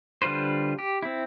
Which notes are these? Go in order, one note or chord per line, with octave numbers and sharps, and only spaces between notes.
D3 G3 F4 B4 C5
G4
C4 E4